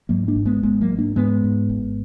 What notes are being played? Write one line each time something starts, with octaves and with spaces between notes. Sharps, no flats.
G#2 F#3 A#3
A#3 D4
G#1
G#3 B3
G#1 G#3 B3
F#3 A#3
G#2
A#3 D4
G#2 G#3 B3
G#2
G#1